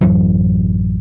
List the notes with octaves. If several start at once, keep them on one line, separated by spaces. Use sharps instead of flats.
A1 F#2 E3 F#3